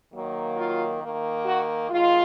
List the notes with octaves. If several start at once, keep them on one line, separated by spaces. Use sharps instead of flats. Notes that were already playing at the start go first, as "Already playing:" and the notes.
D#3 F#3 A#3
F4
D#3 A#3
F#4
D#3 G#3 F4